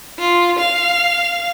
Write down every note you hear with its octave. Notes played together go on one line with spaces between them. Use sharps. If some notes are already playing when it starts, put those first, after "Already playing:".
F4
F5